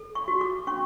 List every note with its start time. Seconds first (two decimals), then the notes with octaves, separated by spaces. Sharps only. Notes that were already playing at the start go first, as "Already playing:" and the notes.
Already playing: A4
0.15 C#6
0.28 F#4
0.41 D6
0.67 C#4 C#6